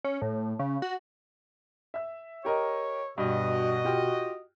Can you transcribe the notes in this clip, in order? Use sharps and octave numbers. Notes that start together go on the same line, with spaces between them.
C#4
A2
C#3
F#4
E5 E6
G4 A#4 C#5 D#5
G2 B2 F#4 D#5
F4 G4